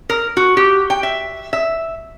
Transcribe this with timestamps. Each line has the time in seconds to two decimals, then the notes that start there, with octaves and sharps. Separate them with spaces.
0.10 A#4
0.37 F#4
0.57 G4
0.90 G5
1.03 E5
1.53 E5